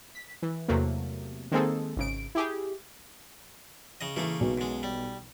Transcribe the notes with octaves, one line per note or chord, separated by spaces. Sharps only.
B6
E3
E2 C3 F#3 A3 A#3
D#3 G#3 A#3 C4 G#4 A4
G#1 C#3 D7
E4 G4 G#4
C#3 D#5
C#3 E3 A3 A#3
B1 B2 F#3
F#2 G#3
G3